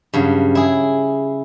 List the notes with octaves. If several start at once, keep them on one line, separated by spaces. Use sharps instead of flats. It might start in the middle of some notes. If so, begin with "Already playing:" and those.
G2 C#3 F#3
E4 G#4